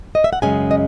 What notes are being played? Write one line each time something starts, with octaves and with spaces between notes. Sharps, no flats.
D#5
E5
F#5
F#2 C#3 G#3 C#4 G#5
D#5